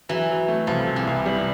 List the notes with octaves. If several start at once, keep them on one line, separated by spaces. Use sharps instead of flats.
E3 F#3
F#3
A3
C2 F3
C3
E3
C2
G3